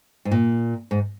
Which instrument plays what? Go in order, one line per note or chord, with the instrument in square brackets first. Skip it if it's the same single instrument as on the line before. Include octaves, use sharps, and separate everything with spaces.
[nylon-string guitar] G#2
A#2
G#2